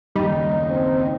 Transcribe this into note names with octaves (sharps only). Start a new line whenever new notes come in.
F#1 D#2 G3 D#4
C4